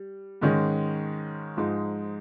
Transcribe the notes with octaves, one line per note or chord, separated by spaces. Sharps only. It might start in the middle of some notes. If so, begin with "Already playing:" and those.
Already playing: G3
G#2 D#3 G#3 C#4
G#2 F3 G#3 D#4